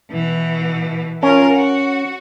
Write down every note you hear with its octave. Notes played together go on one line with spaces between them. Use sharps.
B2 E3
C#4 F4 A#4
F#4